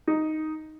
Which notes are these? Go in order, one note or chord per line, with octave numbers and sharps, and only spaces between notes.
D#4